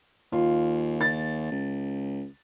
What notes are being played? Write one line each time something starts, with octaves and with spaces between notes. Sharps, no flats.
D#2 F4
A6
C#2